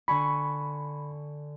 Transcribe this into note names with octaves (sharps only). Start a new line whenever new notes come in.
D3 G#5 B5 C#6